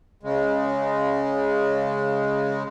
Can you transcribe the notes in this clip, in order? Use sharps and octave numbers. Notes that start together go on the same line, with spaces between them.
C#3 G#3